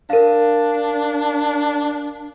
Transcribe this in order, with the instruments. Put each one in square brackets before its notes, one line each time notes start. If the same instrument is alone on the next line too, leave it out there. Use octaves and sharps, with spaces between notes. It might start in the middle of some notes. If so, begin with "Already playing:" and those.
[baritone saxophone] D4 [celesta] A#4 F5